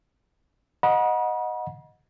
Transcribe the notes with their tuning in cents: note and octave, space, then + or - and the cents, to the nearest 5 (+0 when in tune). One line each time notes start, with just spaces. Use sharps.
D#5 +0 F#5 -20 B5 -45